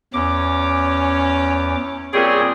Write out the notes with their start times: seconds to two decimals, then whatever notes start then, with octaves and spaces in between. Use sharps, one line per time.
0.14 E2 C#4 D6
2.13 A#2 G3 C4 G#4 C#5 G5